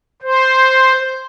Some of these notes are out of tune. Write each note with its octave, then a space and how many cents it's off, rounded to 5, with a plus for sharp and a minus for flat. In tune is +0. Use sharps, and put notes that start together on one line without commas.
C5 +0